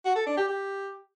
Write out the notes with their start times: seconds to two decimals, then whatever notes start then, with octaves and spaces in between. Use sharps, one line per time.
0.05 F#4
0.16 A4
0.26 D4
0.37 G4
0.47 G4